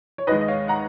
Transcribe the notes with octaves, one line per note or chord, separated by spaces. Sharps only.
C#5
D#2 D#3 G#3 B4 D#5
D#5
C#5 F5
F#5 A#5